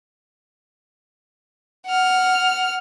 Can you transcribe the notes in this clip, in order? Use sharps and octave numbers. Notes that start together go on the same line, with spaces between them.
F#5 F6